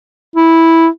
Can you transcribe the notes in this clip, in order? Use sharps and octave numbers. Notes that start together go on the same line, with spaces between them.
E4